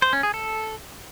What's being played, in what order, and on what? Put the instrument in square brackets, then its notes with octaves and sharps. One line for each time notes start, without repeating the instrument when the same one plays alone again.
[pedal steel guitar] C5
C#4
G#4
A4